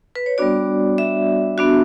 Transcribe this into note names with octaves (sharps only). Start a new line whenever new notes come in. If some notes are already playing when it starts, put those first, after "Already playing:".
B4
C#5
G3 B3 D4 F#4 D5
E5
B3 D4 F#4